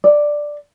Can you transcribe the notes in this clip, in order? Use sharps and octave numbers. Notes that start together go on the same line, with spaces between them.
D5